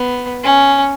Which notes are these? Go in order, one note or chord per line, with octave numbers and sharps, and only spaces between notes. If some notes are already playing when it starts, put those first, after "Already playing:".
Already playing: B3
C#4